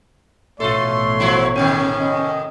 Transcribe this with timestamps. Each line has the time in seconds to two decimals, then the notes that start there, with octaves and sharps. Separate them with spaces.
0.60 A1 B2 E3 A3 F4 A4 C#5 C6
1.20 F3 F#3 E4
1.56 A2 C3 D#3 C#4
1.99 D#5